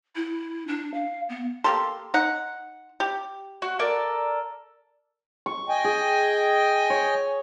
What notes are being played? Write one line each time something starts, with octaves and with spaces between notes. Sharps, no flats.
E4
D4
F5
B3
A#3 G4 A4 C6
D#4 F#5
G4
F#4
A4 A#4 D5
C#6
D#5 G5 G#5
G#4
C#5